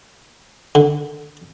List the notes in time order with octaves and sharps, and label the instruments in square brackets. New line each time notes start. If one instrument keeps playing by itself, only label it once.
[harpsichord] D3